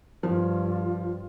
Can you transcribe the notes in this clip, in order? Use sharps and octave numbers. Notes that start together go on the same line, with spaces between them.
G2 F3 F4